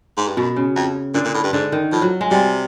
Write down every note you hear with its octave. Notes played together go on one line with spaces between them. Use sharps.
G#2
G2
F#2 B2
C#3
F2
A#2 D3
A#2
A2
G2
G#2 D3
D#3
A2 F3
F#3
G#3
C3 G3